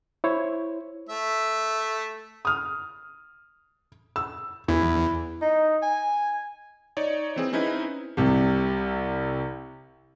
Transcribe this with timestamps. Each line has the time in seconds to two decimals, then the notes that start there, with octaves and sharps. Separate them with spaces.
0.24 E4 C5 C#5
1.09 A3 E5
2.45 D#6 F6
4.16 E6
4.68 E2 E4
5.42 D#4
5.82 G#5
6.97 D#4 C#5 D5
7.36 E3 C4 G#4
7.53 C4 C#4 D#4 E4 B4
8.17 C2 C3